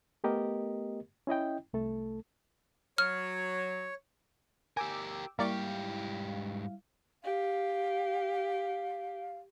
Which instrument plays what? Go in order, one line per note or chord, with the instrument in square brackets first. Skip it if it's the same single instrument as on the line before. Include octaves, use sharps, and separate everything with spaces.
[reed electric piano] A3 B3 G4 A#4 D#5
C#4 E4 D#5 G5
C2 A3 A4
[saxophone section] F#3 [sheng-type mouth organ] C#5 [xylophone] F6
[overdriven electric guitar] G4 A#4 [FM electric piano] G5 D6 E6 [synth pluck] G#5
[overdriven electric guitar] G#2 G4 [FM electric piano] G3 E4 F5 [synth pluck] A#3 D5 C#6
[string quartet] G4 [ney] F5